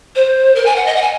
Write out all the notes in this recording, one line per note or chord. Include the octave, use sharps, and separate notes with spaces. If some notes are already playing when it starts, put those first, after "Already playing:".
C5
A#4
G#5
F#5
D#5
F#5
G#5